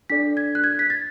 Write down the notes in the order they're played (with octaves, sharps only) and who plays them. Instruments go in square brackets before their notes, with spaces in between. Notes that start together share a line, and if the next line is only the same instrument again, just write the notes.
[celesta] D4 A4 D5 B6
G#6
F#6
G#6
B6
A6